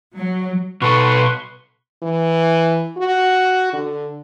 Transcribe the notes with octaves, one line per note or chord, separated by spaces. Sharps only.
F#3
B2 A4 B4 C6 C#6
E3
F#4
D3